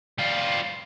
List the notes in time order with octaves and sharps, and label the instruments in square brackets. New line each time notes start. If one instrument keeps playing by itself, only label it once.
[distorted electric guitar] G3 F4